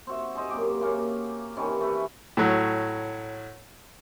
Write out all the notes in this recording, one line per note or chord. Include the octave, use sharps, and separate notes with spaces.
C4 F#4 E5
G#4 A4 C5 D#5
F#2 A#3 G4 D6
C#3 A#3 F5 C#6
C3 D#3 E3 C#4
A3 B4
A2 F#3